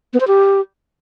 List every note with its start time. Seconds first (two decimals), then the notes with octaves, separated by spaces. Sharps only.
0.13 B3
0.20 C5
0.27 G4